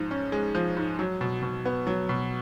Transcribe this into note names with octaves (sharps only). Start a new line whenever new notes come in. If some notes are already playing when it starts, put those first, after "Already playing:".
Already playing: G#2 F3
C#4
G#3
F3
G#2
F#3
B2
B2
B3
F#3
B2